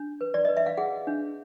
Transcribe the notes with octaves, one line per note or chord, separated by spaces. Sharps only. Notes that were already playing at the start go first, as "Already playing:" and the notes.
Already playing: D4
B4
D5
B4 D#5
E5
F5
G#4 F#5
D4